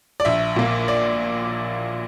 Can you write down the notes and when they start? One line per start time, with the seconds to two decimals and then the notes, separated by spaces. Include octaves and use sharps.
0.20 D5
0.25 A#1 E5
0.56 A#2 A#3
0.88 D5